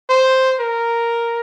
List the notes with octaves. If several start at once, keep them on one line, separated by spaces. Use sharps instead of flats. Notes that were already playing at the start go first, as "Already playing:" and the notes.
C5
A#4